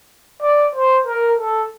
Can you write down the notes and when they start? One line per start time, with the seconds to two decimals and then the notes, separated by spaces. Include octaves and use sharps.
0.42 D5
0.75 C5
1.07 A#4
1.39 A4